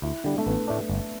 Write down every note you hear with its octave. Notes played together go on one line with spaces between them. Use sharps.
D2 E4
D3 G3 D4
A3
A1 B3
A2 A3 D4
G1